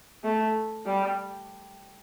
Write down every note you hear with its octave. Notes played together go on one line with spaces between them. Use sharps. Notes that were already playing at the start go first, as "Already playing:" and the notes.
A3
G3